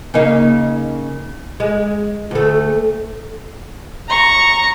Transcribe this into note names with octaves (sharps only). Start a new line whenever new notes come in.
C#3 A#3 D#4
G#3
D2 A3
A#5 C#6